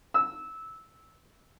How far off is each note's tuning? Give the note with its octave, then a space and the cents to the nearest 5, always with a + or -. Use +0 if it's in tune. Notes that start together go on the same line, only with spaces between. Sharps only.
E6 -15